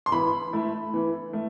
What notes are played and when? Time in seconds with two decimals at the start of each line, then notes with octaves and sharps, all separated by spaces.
0.06 C6
0.12 E3 B5
0.53 A3 E4
0.94 E3
1.33 A3